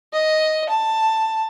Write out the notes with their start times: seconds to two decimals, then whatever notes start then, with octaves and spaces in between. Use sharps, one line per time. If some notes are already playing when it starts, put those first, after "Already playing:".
0.13 D#5
0.69 A5